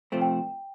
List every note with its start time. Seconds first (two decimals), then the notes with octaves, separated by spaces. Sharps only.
0.12 C3 F3 A3 C4
0.22 G5